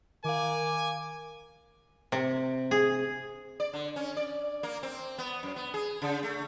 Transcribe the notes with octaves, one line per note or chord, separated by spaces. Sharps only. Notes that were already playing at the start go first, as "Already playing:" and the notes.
D#3 A#4 F5 G#5 D6
C3
G#4
D5
D3
C#4
D5
A#3
C4
B3
F#2
B3
G#4
C#3
A3